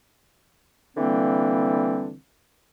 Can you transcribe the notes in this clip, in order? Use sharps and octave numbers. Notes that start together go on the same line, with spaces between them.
D3 E3 G3 A#3 C4